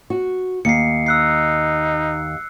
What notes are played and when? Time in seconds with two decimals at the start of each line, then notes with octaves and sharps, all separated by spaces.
0.10 F#4
0.65 D#2 C7 C#7
1.06 D#4 E6 F#6 C7